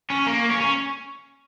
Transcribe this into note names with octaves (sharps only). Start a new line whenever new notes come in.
C#4
A#3
C#4
C#4